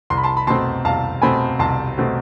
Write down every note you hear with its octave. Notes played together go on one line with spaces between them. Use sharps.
C2 C6
B5
A5 C6
B5
B2 A3 C4 A5 C6
C2 F5 A5
B2 A3 C4 G#5 B5
C2 A5 C6
B2 A3 C4